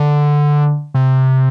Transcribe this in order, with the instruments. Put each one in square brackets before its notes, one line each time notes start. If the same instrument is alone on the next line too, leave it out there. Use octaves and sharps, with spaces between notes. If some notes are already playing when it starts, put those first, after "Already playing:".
Already playing: [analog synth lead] D3
C3